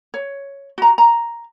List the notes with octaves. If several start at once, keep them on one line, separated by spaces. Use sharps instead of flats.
C#5
F#4 A#5
A#5